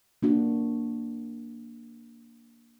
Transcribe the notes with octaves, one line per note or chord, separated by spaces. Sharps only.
A#3 D4 F#4